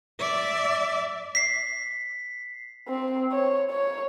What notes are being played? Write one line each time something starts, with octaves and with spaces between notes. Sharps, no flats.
D5 E5
B6 C7
C4
C#5
C#5